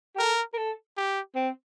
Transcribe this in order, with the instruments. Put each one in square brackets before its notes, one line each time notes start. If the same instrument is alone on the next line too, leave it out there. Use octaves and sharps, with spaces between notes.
[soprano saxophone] G4
[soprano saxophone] A4 [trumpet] A#4
[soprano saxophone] A#4
A4
[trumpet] G4
[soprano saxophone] C4